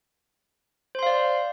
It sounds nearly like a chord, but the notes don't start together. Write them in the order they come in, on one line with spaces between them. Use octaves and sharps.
C5 C6 F5 D5